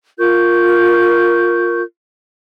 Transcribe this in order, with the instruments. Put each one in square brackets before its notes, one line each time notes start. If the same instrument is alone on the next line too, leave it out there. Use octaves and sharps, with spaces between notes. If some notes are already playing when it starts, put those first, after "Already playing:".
[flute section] F4 A#4 C#6 G6